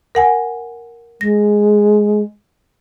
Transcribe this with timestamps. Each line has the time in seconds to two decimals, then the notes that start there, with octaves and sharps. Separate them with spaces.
0.15 A#4 F#5 G#5
1.21 G#3 A#6